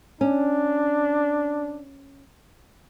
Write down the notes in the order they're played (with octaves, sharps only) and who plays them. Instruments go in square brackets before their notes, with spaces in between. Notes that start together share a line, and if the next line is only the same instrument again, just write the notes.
[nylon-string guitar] C#4 [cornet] D4